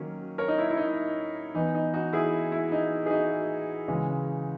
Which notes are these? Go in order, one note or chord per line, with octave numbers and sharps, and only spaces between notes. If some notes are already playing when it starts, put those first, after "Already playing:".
Already playing: D#3 F#3 A#3 C#4
A#4 C#5
D#4
E4
E4
D#4
E3 B3 D#4
D#4
D#4 F#4
E4 G#4
E4
D#4
G#4
D#4 F#4
C#3 E3 G#3